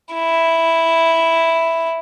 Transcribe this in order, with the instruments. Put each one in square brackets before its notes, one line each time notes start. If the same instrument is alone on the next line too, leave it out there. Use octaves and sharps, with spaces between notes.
[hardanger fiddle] E4